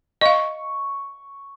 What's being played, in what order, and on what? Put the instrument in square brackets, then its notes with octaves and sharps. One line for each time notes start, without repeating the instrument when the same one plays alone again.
[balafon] D#5 F5 [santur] C#6